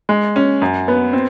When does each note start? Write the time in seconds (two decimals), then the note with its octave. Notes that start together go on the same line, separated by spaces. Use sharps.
0.09 G#3
0.36 C#4
0.62 F#2
0.88 B3
1.13 C4